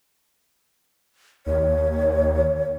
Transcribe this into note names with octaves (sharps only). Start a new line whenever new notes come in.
D#2 C#5